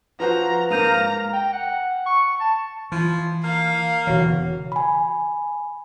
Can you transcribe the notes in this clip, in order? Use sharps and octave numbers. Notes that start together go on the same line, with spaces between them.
F3 F#4 B4 C5 A#5
G#2 A#3 A#4 F5 A#5 G6 D#7 F7
G5
F#5
C#6
A5
E3 F3
A#3 F5
E1 C#3 E3 F#4 C#5
G#5 B5